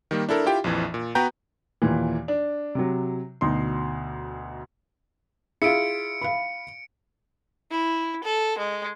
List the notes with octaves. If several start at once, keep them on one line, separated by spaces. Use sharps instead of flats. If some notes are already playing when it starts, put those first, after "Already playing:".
D#3 G3 A#3
D4 E4 A4 A#4
E4 F4 G4 G5
A#1 F2 E3
A#2
B3 F#4 B4 G5 A#5 G6
D#2 A#2 E3
D4
C3 F#3
D2 B2 D#4 C6
E4 F4 G#4 C#7 D7
F5 B5
E4
A4
G#3